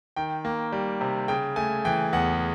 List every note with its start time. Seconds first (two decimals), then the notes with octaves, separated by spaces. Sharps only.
0.16 D#3 G5
0.45 A#3
0.72 G3
1.01 C3
1.28 C#3 G5
1.56 A3 G#5
1.85 E3 G5
2.13 E2 F#5